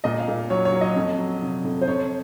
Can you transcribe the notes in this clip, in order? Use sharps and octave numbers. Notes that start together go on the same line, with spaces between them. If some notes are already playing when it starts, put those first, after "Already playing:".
A#2 D#5
F5
A#2
F#3 C#5
C#5
F#3
D#5
F2
F#3
C3
F2
C5
F2 C#5